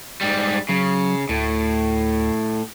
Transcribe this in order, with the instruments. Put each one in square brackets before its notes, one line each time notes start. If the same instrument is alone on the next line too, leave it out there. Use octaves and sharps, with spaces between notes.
[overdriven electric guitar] G#2 G3
[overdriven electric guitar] C#3 [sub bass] F#3
[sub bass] D2 [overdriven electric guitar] A2